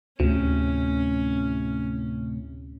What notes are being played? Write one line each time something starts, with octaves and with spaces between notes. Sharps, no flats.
D2 A2 C3 C#4